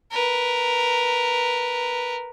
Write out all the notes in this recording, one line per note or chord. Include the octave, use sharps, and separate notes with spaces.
A#4 B4